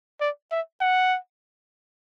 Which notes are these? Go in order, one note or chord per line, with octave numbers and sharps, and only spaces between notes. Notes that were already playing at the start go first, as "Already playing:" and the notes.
D5
E5
F#5